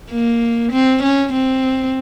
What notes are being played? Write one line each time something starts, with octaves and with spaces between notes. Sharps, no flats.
A#3
C4
C#4
C4